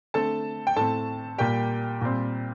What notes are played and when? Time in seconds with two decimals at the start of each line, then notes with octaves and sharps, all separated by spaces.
0.14 D3 A3 C4 A4 A5
0.67 G5
0.76 A2 A3 C4 A4 A5
1.38 A#2 G3 A#3 G4 G5
2.01 A#2 G3 C4